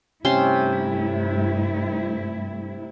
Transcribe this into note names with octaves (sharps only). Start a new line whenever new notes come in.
G2 C3 A3 C#4 E4 C6